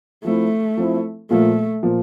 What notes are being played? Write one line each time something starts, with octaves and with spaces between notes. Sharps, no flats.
F3 A3 C4 E4
F3 C4 E4
A#2 F3 A3 A#3
A#2 F3 A#3